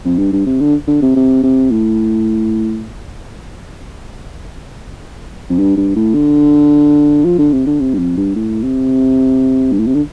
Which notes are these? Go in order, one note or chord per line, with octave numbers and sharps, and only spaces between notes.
F2
G2
G2
C3
D3
D3
C3
C3
C3
A2
F2
G2
G2
A2
D3
F3
D3
C3
D3
C3
G2
F2
G2
A2
C3
G2
A2
C3
D3